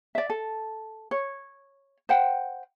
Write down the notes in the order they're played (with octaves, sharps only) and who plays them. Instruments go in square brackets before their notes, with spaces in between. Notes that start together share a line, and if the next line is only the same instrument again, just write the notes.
[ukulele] D5 E5
A4
C#5
C5 F#5 G5